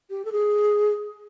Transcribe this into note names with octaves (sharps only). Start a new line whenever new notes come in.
G4
A4
G#4